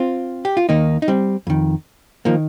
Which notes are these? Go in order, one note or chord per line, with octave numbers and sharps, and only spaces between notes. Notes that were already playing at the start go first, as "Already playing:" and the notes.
Already playing: C4 F4
G4
F4
D#2 D#3 A#3 D#4
D#4
G3 C4
F2 D#3
D#3 F3 A#3